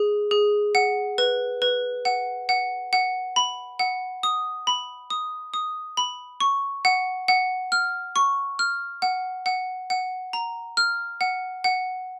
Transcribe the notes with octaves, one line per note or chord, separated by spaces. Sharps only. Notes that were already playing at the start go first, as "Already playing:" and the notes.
Already playing: G#4
G#4
F#5
B4
B4
F#5
F#5
F#5
B5
F#5
D#6
B5
D#6
D#6
B5
C#6
F#5
F#5
F6
C#6
F6
F#5
F#5
F#5
A#5
F6
F#5
F#5